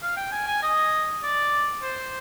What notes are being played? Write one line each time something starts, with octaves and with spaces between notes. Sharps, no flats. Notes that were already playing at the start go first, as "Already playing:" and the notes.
F5
G5
G#5
G#5
D#5
D5
C5